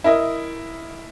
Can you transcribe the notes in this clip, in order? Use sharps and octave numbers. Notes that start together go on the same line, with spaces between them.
E4 A#4 D#5